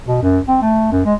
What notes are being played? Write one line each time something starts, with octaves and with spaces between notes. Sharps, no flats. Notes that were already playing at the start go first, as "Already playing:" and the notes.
B2
F#2
C4
A3
F#2
G#3